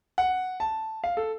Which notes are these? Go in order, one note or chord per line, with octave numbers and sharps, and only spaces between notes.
F#5
A5
F5
A4